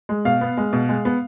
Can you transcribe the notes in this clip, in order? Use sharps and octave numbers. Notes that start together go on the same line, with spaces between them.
G#3
B2 F5
B3
G#3
B2
G#3
B3